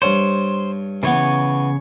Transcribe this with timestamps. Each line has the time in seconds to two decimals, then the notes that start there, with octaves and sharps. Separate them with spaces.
0.02 G2 C5 C#5
1.03 C#3 E3 B3 C#5